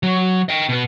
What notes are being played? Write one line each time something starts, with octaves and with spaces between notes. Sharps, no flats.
F#3
D#5 G5
B2 B3